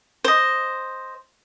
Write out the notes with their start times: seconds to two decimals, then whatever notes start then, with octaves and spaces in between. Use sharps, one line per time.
0.24 C5 D#5